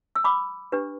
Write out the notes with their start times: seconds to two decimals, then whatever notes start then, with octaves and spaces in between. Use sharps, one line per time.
0.15 E6
0.24 B5 D6
0.72 D4 G4 B4